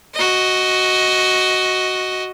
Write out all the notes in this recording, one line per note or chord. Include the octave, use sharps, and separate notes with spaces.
F#4 D#5